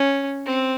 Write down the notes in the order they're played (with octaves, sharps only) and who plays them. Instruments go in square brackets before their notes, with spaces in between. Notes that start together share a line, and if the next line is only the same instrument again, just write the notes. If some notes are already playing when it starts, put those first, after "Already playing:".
Already playing: [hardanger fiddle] C#4
C4